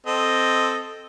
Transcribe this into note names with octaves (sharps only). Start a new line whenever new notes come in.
C4 A4 D#5